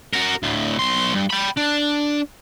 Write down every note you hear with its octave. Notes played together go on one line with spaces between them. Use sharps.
F#4 A#4
D2 A2
B1 C6
G2
G5 B5
D4